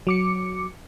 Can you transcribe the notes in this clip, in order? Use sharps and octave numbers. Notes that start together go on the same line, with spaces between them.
F#3 D6 C#7